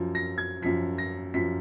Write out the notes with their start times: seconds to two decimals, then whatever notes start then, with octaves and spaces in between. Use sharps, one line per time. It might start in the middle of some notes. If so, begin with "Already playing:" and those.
Already playing: F#2 F3
0.15 A#6
0.38 G#6
0.62 F#2 F3 B6
0.98 A#6
1.34 F#2 F3 B6